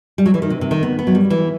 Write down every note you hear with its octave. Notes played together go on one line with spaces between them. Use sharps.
G3
F#3
E3
D#3
C3
C3
D#3
B3
B3
F#3
G3
E3